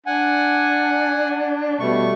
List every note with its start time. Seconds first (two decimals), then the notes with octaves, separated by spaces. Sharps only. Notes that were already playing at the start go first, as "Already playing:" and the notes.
0.06 D4 F#5 G#5
1.80 B2 G3 A3 C#6